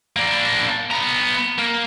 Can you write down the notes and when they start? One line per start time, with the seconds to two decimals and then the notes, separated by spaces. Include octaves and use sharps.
0.16 A#3 D4
0.91 B3 A#5
1.59 A#3